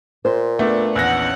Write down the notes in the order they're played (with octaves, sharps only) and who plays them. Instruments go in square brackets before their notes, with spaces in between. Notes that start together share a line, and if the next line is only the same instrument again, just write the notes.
[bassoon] A#2 [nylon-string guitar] C5
[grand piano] A3 D4 [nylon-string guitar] B3
[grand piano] A#1 E2 A#6 [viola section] C#4 F#5